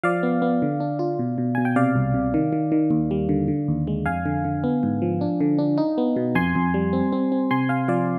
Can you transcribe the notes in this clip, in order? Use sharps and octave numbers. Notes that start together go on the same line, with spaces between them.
F3 D5 F5
B3
B3
D3
D4
F4
B2
B2
B2 G#5
G5
C3 D5 F5
C2
C3
D#3
D#3
D#3
D#2
G3
D3
D3
D#2
G#3
F2 F5 G#5
D3
D3
B3
G#2
F3
D4
D3
D4
D#4
B3
B2
F2 G#5 C6
F2
G3
C4
C4
C4
C3 G#5 C6
C3 F5 G#5
F3 D5 F5